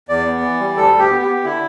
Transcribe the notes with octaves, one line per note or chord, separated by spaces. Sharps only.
E2 D5
B3
E3
G3
D2 A4
D2
G4
B3
G4
B3
D3 E4